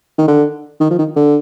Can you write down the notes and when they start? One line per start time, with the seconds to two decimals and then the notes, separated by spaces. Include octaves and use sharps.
0.18 D#3
0.28 D3
0.80 D#3
0.90 F3
0.98 D#3
1.16 D3